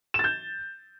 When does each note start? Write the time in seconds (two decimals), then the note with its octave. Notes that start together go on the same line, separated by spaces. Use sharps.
0.14 E7
0.19 A6
0.24 G6